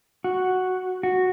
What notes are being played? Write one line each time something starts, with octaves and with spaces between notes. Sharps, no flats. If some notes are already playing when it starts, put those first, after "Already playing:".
F#4
F#4